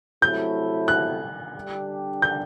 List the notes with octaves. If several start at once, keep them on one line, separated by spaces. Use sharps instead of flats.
C3 F#3 A3 E4 G6
F#6
D3 G3 D4 G4
G6